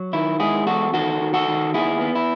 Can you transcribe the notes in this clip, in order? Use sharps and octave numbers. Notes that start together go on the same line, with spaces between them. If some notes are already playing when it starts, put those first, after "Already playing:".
Already playing: F#3
D#3 E4
G#3 E4 G#4
E2 F#4 A4
D#3 F#4 A4
D#3
F#4 A4
D#3
D#2 E4 G#4
B3
E4